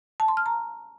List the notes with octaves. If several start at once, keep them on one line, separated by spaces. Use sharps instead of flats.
A5
C6
F6
A#5